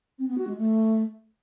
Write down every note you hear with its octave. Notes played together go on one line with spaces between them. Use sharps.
C4
B3
F#4
G#3
A3